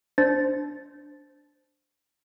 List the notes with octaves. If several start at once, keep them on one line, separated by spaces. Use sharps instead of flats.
D4 C5 A6